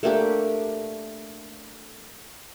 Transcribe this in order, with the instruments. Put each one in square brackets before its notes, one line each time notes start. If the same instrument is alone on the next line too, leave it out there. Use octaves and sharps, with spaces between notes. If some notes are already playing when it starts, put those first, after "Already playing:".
[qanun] A3 A#3 D4 G4